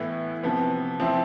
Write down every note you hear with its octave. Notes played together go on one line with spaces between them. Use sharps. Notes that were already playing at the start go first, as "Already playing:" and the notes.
Already playing: A2 E3 B3 E4
C3 F3 B3
F3 C4 E4